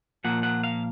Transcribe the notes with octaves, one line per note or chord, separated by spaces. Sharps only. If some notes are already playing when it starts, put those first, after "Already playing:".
A#2 F3 A#3 F#5
F#5
F5